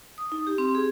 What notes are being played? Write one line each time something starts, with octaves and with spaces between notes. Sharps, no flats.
D#6
D#4
G4
C4
G#4